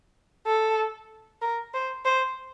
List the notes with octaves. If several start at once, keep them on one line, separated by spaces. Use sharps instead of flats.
A4
A#4
C5
C5